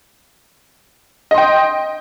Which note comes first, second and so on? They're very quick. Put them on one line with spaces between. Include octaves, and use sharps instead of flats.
D#5 C6 G5